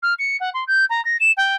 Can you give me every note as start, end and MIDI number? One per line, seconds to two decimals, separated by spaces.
0.03 0.14 89
0.19 0.37 97
0.40 0.50 78
0.54 0.64 84
0.67 0.85 91
0.90 1.03 82
1.05 1.17 94
1.20 1.32 100
1.37 1.56 79